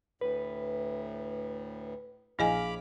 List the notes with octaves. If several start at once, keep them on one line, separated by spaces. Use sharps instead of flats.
D2 A2 B4
A#1 E4 G#4 D#5 F5 G#5 B5 D6